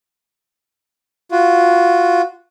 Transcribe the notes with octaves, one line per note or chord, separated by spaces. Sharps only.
F4 F#4